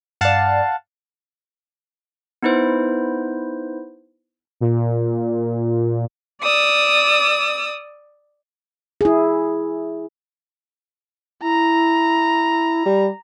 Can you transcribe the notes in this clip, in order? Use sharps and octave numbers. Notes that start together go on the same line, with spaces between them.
G2 D5 F5 F#5 A5
B3 D#4 E4 B4 C5
A#2
D5 D#6 E6
E4 G#4
E4 A#5
G3